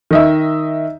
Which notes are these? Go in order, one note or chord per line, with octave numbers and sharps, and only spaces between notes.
D#3 D#5 E5